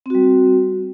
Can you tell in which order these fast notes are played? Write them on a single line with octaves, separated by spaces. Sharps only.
C4 F#4 G3